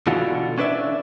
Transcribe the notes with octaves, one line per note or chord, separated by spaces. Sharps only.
B2 D3 E3 F4 F#4
C#4 D4 B4 D5 E5